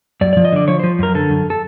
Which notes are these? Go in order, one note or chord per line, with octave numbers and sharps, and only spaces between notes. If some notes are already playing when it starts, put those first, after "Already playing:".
F#2 D5
F3 D5
D#5
D3 D5
F3 C#5
F3 C5
F#2 A#4
D3 A4
F#2
A4